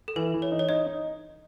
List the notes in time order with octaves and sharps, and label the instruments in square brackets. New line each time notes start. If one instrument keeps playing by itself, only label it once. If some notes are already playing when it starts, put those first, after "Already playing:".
[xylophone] A4
[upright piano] E3 [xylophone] B4
[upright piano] E3
[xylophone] C#5
[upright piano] D#4
[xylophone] C#5
[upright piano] D#4 [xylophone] D#5
[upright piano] D#4